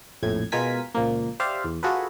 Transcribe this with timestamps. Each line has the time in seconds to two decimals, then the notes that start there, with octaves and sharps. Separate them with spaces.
0.23 A#1 F2 A2 G#6
0.52 B2 G#3 F4 A#4 G#5 B6
0.95 C#2 A#2 F3 A#3
1.40 G4 C5 D5 E5 F5
1.64 E2
1.83 F4 F#4 G#4 A4 B4